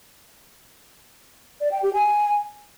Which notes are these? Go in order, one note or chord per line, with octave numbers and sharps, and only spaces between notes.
D5
G5
G4
G#5